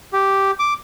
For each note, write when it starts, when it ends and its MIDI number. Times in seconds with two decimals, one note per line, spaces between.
0.13 0.51 67
0.59 0.74 86